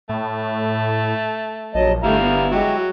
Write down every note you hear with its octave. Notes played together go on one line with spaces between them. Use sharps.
A2 A3
A#1 F#3 D#5 A5
G1 D3 G3 A3 E4 F5 A#5
B3
F#3 G#3 F#4 G4